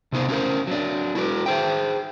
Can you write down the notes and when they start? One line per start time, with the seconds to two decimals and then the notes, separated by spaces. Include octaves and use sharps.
0.12 C3 B3 D#4 C5
0.29 C#4 F4 F#4 A#4 C5
0.67 F#3 D4
1.15 E4 F#4 B4
1.46 G#4 C5 G5